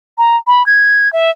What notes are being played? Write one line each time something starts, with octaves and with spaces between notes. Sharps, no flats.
A#5
B5
G#6
E5